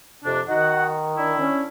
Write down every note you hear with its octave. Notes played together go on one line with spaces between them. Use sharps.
F2 C3 D4
D#3 D#4 F#4 F#5
D4 E4
C#4